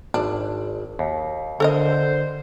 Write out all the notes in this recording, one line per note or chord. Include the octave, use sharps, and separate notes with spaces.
G#1 D4
D#2
D3 A4 A#4 C5 D#5